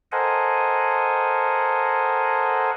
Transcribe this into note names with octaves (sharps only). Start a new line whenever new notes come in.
A4 A#4 C5 D#5 F#5 G#5